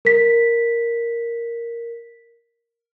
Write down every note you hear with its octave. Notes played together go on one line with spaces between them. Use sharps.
A#4 B6